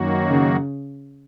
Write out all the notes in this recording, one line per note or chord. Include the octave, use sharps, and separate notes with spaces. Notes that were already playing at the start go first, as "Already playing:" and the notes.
Already playing: F#2 D#3 F#3 A#3 F#4
C#3